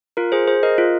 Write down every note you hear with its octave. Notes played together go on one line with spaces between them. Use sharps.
F4 A#4
G#4 C5
G#4 C5
A#4 D#5
F4